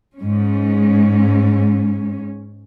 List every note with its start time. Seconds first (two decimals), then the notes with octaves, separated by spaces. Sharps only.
0.18 G#2 C#4